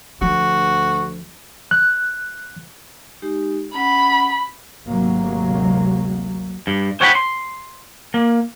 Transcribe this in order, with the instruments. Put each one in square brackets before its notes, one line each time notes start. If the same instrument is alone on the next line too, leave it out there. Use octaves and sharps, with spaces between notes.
[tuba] D2 [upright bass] F3 [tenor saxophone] F#4
[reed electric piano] F#6
[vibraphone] G#3 D#4 G4
[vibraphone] C#4 F#5 [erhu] B5
[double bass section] G#1 D2 C3 F#3 G#3 A#3
[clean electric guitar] G2
C5 C#5 F#5 G5 A#5 B5
C6
A#3